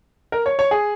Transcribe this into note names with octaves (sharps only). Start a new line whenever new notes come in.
A#4
C#5
C#5
G#4